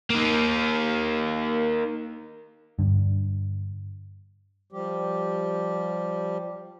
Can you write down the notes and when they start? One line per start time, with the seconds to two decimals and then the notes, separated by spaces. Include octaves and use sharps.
0.10 A#3 D#4
2.79 G2 D3
4.72 F3 G3 G4